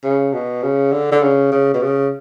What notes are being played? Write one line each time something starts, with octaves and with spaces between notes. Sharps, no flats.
C#3
B2
C#3
D3
D3
C#3
C#3
B2
C#3